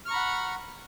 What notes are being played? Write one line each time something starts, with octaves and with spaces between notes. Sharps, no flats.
F#5 A#5 B5 C#6 F6